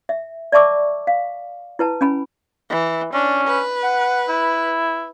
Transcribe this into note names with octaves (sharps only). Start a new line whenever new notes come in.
E5
D5 E5 A5 C#6 D6 E6
F5
E4 B4 A5
C#4 G#5 B5
E3
C#4 D4
B4
F#5
E4